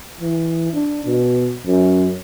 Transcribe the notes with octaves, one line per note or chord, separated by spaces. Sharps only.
E3
D4
B2
F#2